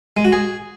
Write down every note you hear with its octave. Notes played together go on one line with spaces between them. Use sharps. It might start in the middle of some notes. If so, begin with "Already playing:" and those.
G#3
F#4
G#4